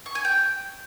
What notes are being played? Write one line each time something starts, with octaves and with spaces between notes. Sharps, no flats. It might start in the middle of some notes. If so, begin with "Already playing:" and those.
C#6
G#5
G5